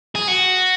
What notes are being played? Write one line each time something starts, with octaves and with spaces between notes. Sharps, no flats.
G#4
F#4